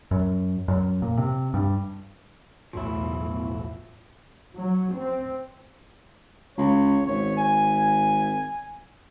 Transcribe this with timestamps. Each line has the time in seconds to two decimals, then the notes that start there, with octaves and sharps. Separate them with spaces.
0.11 F#2
0.68 F#2
1.02 A#2
1.18 C3
1.54 G2
2.73 B1 E2 A2 F3 F#3 E4
4.56 F#3
4.95 C4
6.57 C#2 C#5
7.06 G#1 C#5
7.37 G#5